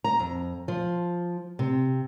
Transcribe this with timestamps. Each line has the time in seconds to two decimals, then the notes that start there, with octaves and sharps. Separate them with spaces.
0.04 A#5
0.19 F2
0.68 F3
1.59 C3